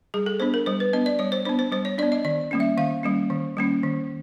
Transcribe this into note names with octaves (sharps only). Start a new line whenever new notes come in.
G3 G#4
A4
B3 D4 C5
A#4
G3 C5
B4
B3 D4 D#5
D5
G3 C#5
C5
B3 D4 C5
C5
G3 C5
C#5
B3 D4 D5
D#5
D#3 D5
G3 A#3 C#4
E5
D#3 F5
G3 A#3 C#4
D#3
G3 A#3 C#4
D#3